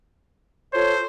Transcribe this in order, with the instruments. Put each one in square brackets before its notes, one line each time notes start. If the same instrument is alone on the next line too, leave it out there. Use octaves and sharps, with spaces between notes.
[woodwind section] F4 A4 C#5 [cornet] C5